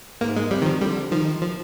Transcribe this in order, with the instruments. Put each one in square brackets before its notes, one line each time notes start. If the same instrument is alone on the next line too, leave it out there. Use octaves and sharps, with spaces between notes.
[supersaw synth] G#2 [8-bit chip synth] A#3
[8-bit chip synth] G#3
[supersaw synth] C3 [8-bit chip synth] G3
[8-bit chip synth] D#3
F3
[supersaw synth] D3 [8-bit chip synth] G3
[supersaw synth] D#3 [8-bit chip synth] F3
[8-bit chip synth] F3